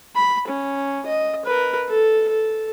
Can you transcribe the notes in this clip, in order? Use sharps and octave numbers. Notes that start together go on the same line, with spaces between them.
B5
C#4
D#5
A#4 B4
A4
A4